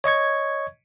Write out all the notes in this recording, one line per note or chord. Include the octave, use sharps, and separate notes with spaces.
C#5 D#5 C#6 G#6